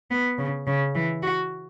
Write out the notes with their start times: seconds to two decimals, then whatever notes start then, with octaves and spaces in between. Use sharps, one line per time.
0.11 B3
0.38 C#3
0.67 C#3
0.95 E3
1.23 F#4